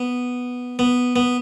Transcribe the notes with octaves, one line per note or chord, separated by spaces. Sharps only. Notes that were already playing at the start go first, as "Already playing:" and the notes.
Already playing: B3
B3
B3